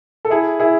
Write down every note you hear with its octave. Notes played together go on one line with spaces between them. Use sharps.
A4
E4 G#4
E4 G#4